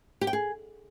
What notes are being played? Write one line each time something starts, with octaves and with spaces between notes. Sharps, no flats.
G4
G5
G#4